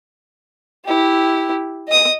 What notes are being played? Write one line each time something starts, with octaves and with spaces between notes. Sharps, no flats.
E4 G4
D#5 D#6